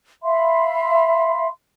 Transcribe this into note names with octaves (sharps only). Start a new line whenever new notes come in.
E5 F5 B5 C6